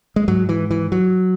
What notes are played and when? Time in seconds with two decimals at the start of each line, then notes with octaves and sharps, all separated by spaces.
0.16 G#3
0.28 G#2 F#3
0.49 E3
0.71 E3
0.92 F#3